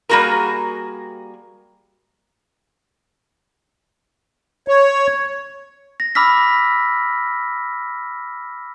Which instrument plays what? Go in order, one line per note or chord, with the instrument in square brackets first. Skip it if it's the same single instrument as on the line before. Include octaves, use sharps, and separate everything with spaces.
[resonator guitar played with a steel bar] G3 A#3 F#4 G#4 A#4
[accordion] C#5
[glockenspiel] A#6
B5 D6 E6 F6 A#6 B6